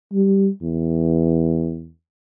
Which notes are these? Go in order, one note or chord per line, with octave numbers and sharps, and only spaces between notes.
G3
E2